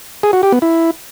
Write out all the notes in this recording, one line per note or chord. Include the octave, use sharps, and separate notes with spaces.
G#4
F#4
G4
B3
E4